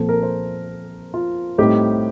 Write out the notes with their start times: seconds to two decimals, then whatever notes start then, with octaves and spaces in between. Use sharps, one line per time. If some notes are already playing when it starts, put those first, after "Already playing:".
Already playing: A#2 F3 C4 A4
0.09 A#4
0.23 C5
1.14 F4
1.58 A2 G3 C4 D#4 G4